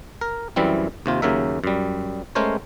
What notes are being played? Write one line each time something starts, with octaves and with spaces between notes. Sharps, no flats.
A#4
F#2 E3 G3 C4 E4
D#2 C3 F4
D#2 C#3 F#3 A#4 E5
F#2 G3
G#3 A3 C#4 A#4 C5 C#5